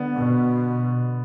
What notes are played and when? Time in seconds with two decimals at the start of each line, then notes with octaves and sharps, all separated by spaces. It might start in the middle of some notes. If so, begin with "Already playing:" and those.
Already playing: D3 B3
0.17 B2